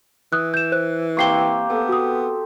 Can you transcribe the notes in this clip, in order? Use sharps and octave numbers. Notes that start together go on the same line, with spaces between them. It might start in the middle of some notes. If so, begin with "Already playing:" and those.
E3 D#6 F#6
G6 E7
C5 F#6
A#3 C4 G4 C#6 C7 G7
B3 A4
F#4 D#6